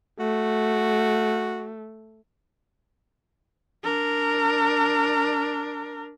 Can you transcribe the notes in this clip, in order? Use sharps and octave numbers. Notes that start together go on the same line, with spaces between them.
A3 F#4
D4 A#4